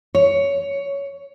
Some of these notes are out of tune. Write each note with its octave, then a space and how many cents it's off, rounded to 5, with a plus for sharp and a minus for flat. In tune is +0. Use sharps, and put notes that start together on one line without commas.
C#5 +15